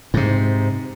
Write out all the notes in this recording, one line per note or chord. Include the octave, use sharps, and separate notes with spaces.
G#2 C3